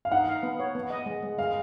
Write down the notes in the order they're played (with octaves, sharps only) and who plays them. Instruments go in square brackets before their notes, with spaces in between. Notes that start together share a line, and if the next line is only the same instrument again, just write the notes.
[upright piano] F5
[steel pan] D#4 [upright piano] F#5
[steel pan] F5
B3
C#5
B3
D#5
G#3
G#3
[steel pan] G#3 [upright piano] F5